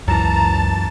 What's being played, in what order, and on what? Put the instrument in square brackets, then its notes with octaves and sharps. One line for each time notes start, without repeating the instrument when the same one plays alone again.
[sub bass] C#2 [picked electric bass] F#2 E3 [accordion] A5 [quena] A#5